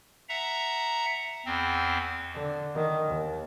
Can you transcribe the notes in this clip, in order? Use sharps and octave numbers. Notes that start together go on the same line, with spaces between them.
E5 F#5 A#5
E2 C4
D3
D#3
D#2